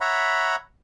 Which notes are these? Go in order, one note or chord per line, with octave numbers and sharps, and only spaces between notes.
C#5 E5 F#5 A#5 B5